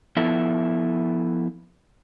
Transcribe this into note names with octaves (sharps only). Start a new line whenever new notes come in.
F3 B3 E4 A4 E5